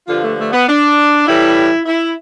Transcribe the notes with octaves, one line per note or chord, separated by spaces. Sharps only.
G2 D3 F3 F4
A3
A3
B3
D4
A2 E3 G3 E4
E4